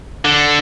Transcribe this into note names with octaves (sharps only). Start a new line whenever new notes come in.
D3